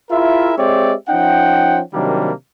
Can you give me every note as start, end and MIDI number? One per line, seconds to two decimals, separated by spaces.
0.10 0.52 64
0.10 0.52 65
0.10 0.52 68
0.10 0.52 70
0.10 0.52 76
0.57 0.93 56
0.57 0.93 60
0.57 0.93 67
0.57 0.93 73
0.57 0.93 74
0.57 0.93 76
1.09 1.80 53
1.09 1.80 61
1.09 1.80 63
1.09 1.80 78
1.09 1.80 79
1.93 2.31 48
1.93 2.31 51
1.93 2.31 54
1.93 2.31 55
1.93 2.31 58
1.93 2.31 62